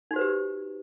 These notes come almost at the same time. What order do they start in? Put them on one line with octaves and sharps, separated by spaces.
D#4 F#4 C5 B4 G4